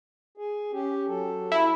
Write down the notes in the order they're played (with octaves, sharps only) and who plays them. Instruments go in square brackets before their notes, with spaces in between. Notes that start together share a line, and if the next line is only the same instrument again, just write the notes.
[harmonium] G#4
C#4 G4
F#3 A4
[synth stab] E4